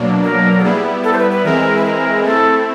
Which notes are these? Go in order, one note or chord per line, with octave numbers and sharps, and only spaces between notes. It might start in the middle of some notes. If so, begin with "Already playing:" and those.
Already playing: B2 F#3 A#3 D4
A#4
A4
G3 B3 E4 G#4
A4
C5
B4
B4
E3 G#3 C4 E4 G#4 A#4
B4
A#4
A3 C4 E4 A4